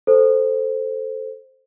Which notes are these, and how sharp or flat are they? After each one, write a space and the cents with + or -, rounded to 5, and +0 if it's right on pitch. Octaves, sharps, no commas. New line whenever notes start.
A4 +0 C5 +0